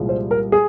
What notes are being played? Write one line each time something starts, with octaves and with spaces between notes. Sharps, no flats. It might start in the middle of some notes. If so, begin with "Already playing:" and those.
Already playing: C2 A#2 F3 G#3
C5
A#4
G#4